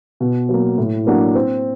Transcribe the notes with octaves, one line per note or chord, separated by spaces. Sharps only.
B2
F#3 A#3
A2
F#3 A#3 D4 F#4
C4